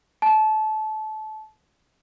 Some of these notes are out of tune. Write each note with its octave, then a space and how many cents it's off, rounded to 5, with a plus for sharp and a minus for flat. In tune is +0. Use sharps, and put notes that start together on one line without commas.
A5 -25